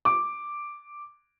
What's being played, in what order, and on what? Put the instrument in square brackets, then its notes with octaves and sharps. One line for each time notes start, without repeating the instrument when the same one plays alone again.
[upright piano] D6